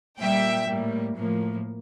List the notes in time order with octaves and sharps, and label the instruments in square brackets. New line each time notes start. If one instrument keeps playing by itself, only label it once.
[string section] A#2 G3 A#3 E5 G5
A2 G3 A#3
A2 F3 A#3